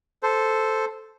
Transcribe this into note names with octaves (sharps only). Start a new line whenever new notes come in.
A4 C5